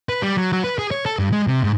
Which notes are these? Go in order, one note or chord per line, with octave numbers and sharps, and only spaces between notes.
B4
G3
F#3
F#3
B4
G#4
C#5
A4
G2
G#3
C3
G#2